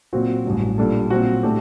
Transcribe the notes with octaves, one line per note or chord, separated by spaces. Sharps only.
A#2 F#3 C4 F#4
A1 G2 F#3
A#2 G3 D4 A4
A#2 F#3 C4 F#4
A2 A3 D4 G4